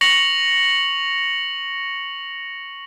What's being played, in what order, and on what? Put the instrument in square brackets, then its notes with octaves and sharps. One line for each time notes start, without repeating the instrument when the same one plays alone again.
[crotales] C#6 A#6 C#7 F7 F#7